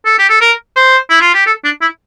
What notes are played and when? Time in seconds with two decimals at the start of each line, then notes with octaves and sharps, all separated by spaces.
0.05 A4
0.18 G4
0.29 A4
0.41 A#4
0.76 C5
1.10 E4
1.21 F4
1.34 G4
1.46 A4
1.64 D4
1.81 E4